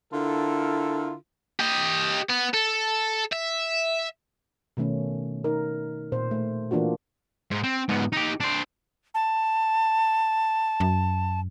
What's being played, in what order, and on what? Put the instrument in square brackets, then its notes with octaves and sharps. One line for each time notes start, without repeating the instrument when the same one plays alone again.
[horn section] D3 E4 F4 A4 A#4
[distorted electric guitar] G4 D#5
B3
A4
E5
[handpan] B2 D#3 A3 C#4
D#4 A#4
A#2 C5
A3
E3 A#3 D4 F4 F#4
[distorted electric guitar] G#2
C4
G#2 B3
D#4 G4
D4 C5
[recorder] A5
[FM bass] F#2